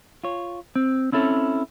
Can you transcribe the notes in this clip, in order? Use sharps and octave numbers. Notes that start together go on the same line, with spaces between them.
F4 C#5
C4
C4 C#4 E4 A4 B4 C#5